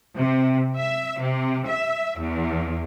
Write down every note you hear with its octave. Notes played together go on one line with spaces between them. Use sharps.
C3
E5
C3
E5
E2